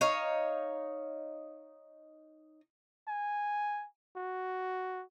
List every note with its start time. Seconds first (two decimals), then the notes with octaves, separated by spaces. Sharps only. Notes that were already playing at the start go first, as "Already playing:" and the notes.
0.01 D#4 C#5 F5
3.08 G#5
4.17 F#4